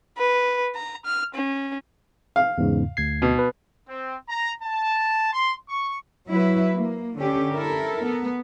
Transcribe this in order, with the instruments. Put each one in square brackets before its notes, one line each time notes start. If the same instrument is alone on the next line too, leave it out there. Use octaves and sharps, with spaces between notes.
[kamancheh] B4
A#5
F6
C#4
[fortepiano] F5
[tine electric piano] E2 G#2 C#3
D2 G#6 C7
[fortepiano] B2
[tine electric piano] B4
[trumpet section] C4
A#5
A5
C6
C#6
[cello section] F#3 E4 B4
A#3
D3 C#4 G4
E4 A4 A#4
B3